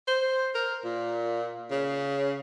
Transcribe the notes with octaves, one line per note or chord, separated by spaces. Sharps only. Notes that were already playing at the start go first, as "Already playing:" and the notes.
C5
A#4
A#2
C#3